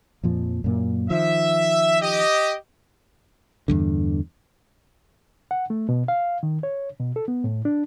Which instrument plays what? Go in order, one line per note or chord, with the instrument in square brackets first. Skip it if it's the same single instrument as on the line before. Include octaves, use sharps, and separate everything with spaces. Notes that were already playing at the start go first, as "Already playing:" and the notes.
[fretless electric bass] F2 A#2 F3
F#2 A#2 A#3
[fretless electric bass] D#3 F3 [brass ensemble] E5
[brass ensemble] G4 D#5
[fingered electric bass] E2 G2 D3
[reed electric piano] F#5
A3
B2
F5
D#3
C#5
B2
A4
B3
A2
D4